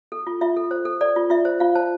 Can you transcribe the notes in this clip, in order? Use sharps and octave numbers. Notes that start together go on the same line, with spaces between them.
A4
F4
F4 E5
A4
C5
A4
A4 D5
F4
F4 E5
C5
F4 F5
C5 A5